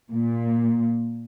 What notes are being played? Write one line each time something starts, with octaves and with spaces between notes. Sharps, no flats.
A#2